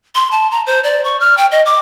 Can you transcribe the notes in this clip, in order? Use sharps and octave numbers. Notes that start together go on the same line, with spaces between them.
C6
A5
A#5
C5
D5
C#6
F6
G5
D#5
D6